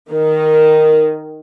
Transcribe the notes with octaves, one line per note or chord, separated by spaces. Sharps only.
D#3